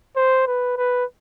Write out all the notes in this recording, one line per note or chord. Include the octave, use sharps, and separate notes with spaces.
C5
B4
B4